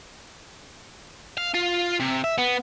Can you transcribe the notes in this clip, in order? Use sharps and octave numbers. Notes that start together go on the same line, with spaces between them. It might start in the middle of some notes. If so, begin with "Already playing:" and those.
F5
F4
C3
E5
B3